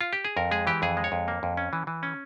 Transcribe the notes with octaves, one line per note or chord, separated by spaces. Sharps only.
F4
G4
G#4
F2 A#4
G#3 G#4
E3 G4
F2 G#4
G#3
C#5
F2
A#3
F2
C#4
E3
E3
C#4